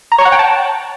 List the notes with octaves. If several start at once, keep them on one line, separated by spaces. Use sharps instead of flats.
A#5
C#5
F#5
G5
A5